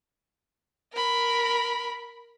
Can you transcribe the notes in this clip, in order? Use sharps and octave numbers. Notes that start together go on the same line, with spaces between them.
A#4 B5